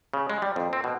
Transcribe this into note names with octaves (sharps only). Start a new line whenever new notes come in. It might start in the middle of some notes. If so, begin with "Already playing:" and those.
C#3
G#3
G3
F2
C4
B2